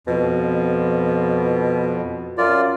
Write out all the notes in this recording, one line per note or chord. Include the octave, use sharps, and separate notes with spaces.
F2 B2
F#2 F4 D5